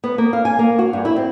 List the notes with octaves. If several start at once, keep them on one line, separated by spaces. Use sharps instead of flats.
B3
A#3
F5
G#5
A#3
F#4
G2
E4
C4